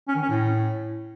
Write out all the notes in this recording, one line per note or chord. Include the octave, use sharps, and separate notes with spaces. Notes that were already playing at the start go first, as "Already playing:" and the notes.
C#4
D#3
C#4
A2